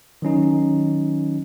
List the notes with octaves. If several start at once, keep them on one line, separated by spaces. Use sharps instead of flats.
D#3 F#3 C#4 D#4